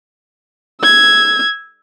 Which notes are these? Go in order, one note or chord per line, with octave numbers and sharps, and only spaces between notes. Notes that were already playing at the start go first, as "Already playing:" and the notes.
E6 G#6